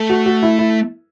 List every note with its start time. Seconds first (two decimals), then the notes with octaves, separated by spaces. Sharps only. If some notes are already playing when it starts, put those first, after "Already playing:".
Already playing: A3
0.09 F#4
0.26 F#4
0.43 E4
0.59 E4